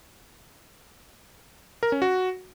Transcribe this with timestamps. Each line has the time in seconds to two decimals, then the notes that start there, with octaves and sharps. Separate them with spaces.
1.83 A#4
1.92 C#4
2.02 F#4